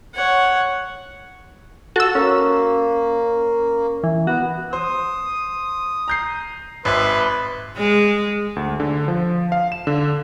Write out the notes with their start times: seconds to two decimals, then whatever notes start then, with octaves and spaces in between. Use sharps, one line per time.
0.14 C#5 F#5
1.96 F#4 A4 E6
2.15 A#3 C#4
4.04 E3
4.27 B3 F#4
4.73 C5 D#6
6.08 A#5 G6 C7
6.85 G#1 B4 E5 C6
7.77 G#3
8.56 D2
8.80 D3
9.08 F3
9.52 F5
9.72 E7
9.87 D3